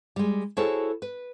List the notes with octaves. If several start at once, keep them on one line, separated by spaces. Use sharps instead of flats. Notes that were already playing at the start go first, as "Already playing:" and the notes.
G3 G#3
E4 F#4 G#4 A4 C5 C#5
B4